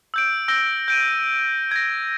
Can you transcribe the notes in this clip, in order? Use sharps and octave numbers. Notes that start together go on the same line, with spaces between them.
E6 G6 D7
E6 G6 A#6 G7
G6 D7 D#7
G#6 A#6